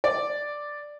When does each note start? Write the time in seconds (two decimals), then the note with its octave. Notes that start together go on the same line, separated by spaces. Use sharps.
0.04 D5